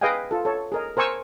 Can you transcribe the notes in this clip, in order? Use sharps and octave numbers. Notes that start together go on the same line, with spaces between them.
G#4 B4 D#5 F5 G5 G#5
F4 A4
A4 C#5
G#4 A#4 D#5
A#4 C5 G#5 C#6 E6